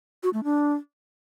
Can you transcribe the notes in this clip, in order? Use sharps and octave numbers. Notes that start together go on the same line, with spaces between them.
F#4
A3
D4